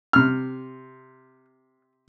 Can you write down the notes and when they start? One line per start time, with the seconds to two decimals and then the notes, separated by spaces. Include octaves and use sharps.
0.13 C3 F6